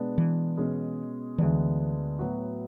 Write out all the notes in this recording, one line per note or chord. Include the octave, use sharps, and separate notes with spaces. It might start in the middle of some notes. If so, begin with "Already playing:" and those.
Already playing: B2 G#3 B3 D4
E3
B2 G#3 C#4 G#4
D2 D3 E3 G#3 B3 D4
A2 F#3 B3 F#4